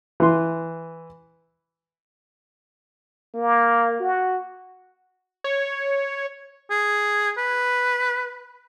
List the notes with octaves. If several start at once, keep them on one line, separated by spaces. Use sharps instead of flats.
E3 C6
A#3
F#4
C#5
G#4
B4